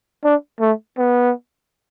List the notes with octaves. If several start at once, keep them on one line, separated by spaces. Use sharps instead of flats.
D4
A3
B3